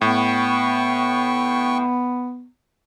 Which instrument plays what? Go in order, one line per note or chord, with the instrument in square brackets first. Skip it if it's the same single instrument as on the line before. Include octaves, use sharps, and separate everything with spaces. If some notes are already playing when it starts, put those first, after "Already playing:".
[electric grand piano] A2 [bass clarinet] B3 [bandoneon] G5 C#6